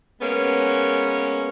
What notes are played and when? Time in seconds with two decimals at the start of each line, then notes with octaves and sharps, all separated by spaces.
0.21 G#3 A#3 B3 C#4